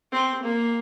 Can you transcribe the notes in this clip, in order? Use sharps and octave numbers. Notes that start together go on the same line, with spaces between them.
C4
A#3